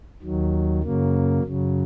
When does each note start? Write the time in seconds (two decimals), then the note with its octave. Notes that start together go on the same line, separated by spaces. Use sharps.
0.23 D#2 D#3 F#3
0.83 F#2 C#3 F#3 A#3
1.43 F#2 C#3 F#3